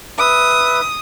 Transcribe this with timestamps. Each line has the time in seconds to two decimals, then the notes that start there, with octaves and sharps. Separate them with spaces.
0.19 B4 E5 D#6